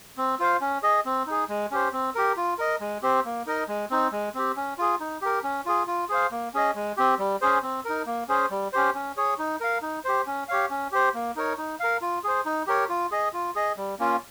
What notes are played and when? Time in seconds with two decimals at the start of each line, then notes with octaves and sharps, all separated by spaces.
0.18 C4
0.39 F4 C5 F5
0.61 C#4
0.83 G#4 D#5
1.05 C4
1.27 D#4 G#4
1.49 G#3
1.71 C#4 G4 C5
1.93 C4
2.15 G4 A#4
2.37 F4
2.58 A#4 D#5
2.80 G#3
3.02 C4 G4 C5
3.25 A#3
3.46 D#4 A#4 D#5
3.68 G#3
3.90 C4 D#4
4.12 G#3
4.34 C4 G4
4.56 C#4
4.78 F4 G#4
5.00 D#4
5.22 G4 A#4
5.44 C#4
5.66 F4 G#4
5.87 F4
6.09 G#4 C5 F5
6.31 A#3
6.54 C#4 G#4 D#5
6.75 G#3
6.97 C4 G4
7.19 G3
7.41 C#4 G#4 C5
7.63 C4
7.85 D#4 A#4
8.06 A#3
8.28 C#4 G#4 C5
8.51 G3
8.73 C#4 G4 C5
8.95 C#4
9.17 G#4 C#5
9.39 D#4
9.60 A#4 F5
9.82 D#4
10.04 G4 C5
10.26 C#4
10.48 G4 C#5 F5
10.70 C#4
10.92 G4 C5
11.14 A#3
11.36 D#4 A#4 C#5
11.58 D#4
11.80 A#4 F5
12.01 F4
12.24 G#4 C5
12.45 D#4
12.67 G4 A#4 C#5
12.89 F4
13.11 G#4 D#5
13.33 F4
13.55 G#4 D#5
13.77 G3
13.99 A#3 C#4 F4